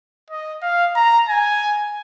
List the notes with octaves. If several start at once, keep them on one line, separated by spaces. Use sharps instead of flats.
D#5
F5
A#5
G#5